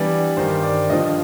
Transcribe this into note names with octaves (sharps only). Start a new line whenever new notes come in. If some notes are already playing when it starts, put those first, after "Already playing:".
Already playing: E3 G3 B3 D4 D5
G2 D#3 G3 C5
D5
G2 D3 F3 D#5